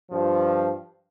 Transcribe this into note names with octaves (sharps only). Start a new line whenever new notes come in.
G2 F3